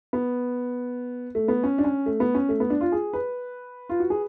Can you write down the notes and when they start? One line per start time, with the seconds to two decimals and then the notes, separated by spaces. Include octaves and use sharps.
0.13 B3
1.35 A3
1.48 B3
1.63 C#4
1.78 D4
1.84 C#4
2.06 A3
2.20 B3
2.34 C#4
2.49 A3
2.60 B3
2.70 D4
2.81 F4
2.92 G#4
3.13 B4
3.89 F4
4.00 F#4
4.10 G#4